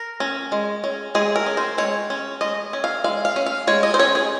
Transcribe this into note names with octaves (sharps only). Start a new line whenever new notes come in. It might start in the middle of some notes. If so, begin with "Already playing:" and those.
Already playing: A#4
C#4
G#3
C#4
G#3 G#4
A#4
C#4
C5
G#3 C#5
C#4
G#3 D#5
C#4
F5
G#3 F5
F5
C#4
F5
G#3 C#5
D#5
C5
C#4 C#5
G#4